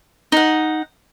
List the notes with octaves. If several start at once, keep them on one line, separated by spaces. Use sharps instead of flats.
D#4 F#5